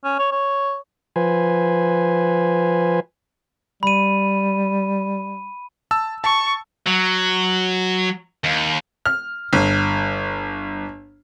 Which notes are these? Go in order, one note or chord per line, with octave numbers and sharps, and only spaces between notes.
C#4
C#5
C#5
F3 B4 C5 G#5
G3 B5 D#7
A5 E6
A5 C#6
F#3
D#2
F6
G1